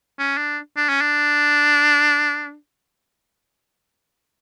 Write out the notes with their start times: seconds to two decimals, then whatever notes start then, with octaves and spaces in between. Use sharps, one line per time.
0.19 C#4
0.38 D4
0.77 D4
0.89 C#4
1.01 D4